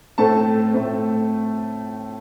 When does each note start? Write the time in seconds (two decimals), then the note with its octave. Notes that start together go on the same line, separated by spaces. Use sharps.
0.18 A2 A3 C4 A4 A5
0.73 A2 A3 C4